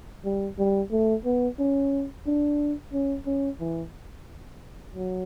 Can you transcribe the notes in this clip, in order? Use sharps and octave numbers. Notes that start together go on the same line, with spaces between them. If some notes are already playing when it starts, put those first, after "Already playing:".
G3
G3
A3
B3
C#4
D4
C#4
C#4
E3
F#3